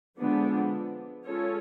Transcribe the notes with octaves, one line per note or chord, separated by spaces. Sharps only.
D3 F3 G#3 B3 D4
G#3 C#4 F4 A4 C#5